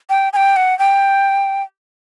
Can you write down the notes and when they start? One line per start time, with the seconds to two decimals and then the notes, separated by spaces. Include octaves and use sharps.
0.10 G5
0.33 G#5
0.36 G5
0.56 F#5
0.79 G5